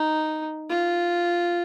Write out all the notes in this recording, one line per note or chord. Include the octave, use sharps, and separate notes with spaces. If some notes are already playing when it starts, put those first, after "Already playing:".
Already playing: D#4
F4